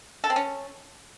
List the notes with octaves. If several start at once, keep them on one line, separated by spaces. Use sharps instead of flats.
A4
C4
C#4